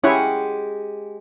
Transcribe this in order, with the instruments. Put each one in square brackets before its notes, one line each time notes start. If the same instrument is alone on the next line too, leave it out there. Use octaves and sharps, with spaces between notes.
[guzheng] G#3 G4 F#5 [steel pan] C#4 E4 C#5